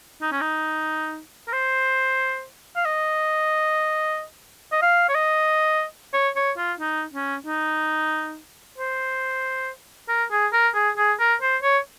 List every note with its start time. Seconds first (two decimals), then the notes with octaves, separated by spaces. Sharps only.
0.22 D#4
0.32 C#4
0.41 D#4
1.47 A#4
1.53 C5
2.76 F5
2.85 D#5
4.72 D#5
4.82 F5
5.09 C#5
5.15 D#5
6.14 C#5
6.36 C#5
6.58 F4
6.80 D#4
7.13 C#4
7.46 D#4
8.78 C5
10.09 A#4
10.32 G#4
10.53 A#4
10.75 G#4
10.98 G#4
11.19 A#4
11.42 C5
11.63 C#5